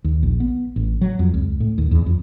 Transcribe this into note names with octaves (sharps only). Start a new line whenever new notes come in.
D#2
A#1
B3
A1
F#3
F2
C#2
A2
D#2
E2
F2